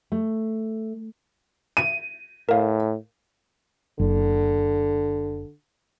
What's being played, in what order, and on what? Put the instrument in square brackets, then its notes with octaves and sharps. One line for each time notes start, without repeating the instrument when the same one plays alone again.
[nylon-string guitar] A3
[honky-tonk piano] D#7
[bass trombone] A2 [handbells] A#4 F5
[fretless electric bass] F#1 [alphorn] D3